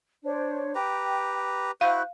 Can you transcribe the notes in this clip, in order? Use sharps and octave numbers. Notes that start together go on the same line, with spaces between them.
D4 C5 C#5
G4 B4 G5 A#5
E4 F#4 C5 F5 F#6 G6